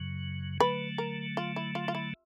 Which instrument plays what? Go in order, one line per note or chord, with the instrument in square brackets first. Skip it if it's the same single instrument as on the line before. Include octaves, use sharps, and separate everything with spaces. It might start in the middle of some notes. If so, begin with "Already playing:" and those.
Already playing: [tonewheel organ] F#2 C#3 F#3
[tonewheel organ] D3 F#3 A3 [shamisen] B4
[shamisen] A#4
F4
E4
F4
F4
E4